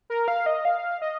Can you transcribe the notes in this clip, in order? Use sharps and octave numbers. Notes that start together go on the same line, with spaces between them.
A#4
F5
D#5
F5
D#5